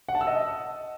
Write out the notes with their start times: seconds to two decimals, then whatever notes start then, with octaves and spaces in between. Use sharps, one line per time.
0.09 F#5
0.15 A5
0.21 E6
0.27 D#5